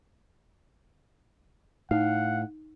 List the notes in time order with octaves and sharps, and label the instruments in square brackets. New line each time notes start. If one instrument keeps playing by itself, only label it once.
[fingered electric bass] A2 [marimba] D#4 [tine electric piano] F5 [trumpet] F#5